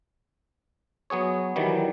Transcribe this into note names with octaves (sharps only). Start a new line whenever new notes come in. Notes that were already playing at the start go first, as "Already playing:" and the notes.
F#3 B3 G#4 C#5
D#3 E3 F#3 G3